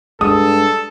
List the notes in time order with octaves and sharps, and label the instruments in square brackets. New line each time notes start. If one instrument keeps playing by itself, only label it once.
[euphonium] G2 [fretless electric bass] G#3 [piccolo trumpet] A4 [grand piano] D#6